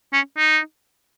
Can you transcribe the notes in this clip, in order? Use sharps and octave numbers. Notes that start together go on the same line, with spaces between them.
C#4
D#4